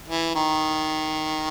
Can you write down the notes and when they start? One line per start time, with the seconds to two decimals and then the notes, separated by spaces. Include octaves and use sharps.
0.08 E3
0.35 D#3